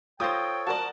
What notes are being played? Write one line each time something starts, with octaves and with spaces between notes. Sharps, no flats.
F4 A4 C5 C#5 G5 D#6 G6 A#6
F#4 A#4 D5 A5